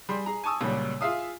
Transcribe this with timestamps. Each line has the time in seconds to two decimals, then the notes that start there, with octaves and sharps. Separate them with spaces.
0.09 G3 G#4 C6
0.26 G#4 A#5
0.44 G#5 A5 C#6 D#6 E6
0.61 C#2 A#2 F#3 G3
1.01 F4 G#4 E5 F5 D#6